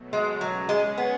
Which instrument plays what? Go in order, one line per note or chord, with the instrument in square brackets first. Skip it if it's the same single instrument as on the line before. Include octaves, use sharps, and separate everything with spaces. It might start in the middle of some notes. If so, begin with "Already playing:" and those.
Already playing: [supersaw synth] B2 F#3 A3
[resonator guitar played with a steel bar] G#3
[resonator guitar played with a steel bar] F#3 [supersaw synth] G#3 C#4 G#4
[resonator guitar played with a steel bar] G#3
B3